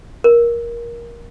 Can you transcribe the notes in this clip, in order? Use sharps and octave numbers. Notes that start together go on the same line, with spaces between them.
A#4